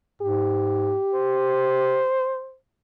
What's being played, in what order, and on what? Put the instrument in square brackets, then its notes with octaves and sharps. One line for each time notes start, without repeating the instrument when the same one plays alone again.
[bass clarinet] G#2 [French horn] G4
[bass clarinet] C5